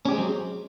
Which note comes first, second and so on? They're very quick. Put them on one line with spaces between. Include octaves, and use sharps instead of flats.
C#4 G4 G#3 C4 F#3